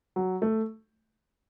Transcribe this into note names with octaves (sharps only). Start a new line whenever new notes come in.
F#3
A3